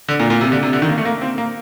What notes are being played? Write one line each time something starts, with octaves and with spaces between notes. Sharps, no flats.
D3
A#2
A#2
C3
D3
C3
D3
D#3
A#3
A3
A#3
C4
A#3